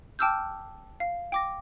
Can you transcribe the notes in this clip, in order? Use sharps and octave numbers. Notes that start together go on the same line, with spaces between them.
G5 A5 D6 E6 F6 G6
F5
G5 D6 A#6